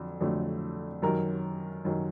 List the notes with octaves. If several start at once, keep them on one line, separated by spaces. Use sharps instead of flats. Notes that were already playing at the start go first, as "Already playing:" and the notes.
Already playing: F2 D3 F#3
F2 D3 F#3 A3
F#2 D#3 F#3 A#4
F#2 D#3 F#3